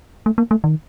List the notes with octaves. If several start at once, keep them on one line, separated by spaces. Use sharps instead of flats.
A3
A#3
A3
D#3